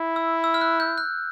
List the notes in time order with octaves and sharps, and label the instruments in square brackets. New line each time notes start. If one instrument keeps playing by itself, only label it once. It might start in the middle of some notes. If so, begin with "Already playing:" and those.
Already playing: [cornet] E4
[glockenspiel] E6
E6
F6
F#6
G6
F#6